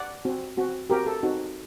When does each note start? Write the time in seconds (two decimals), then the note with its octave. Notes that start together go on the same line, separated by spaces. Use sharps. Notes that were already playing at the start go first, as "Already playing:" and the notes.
Already playing: D5 F#5
0.25 C4 F#4
0.57 C4 F#4
0.90 C4 F#4 G4 A#4
1.06 A4
1.23 C4 D#4 F#4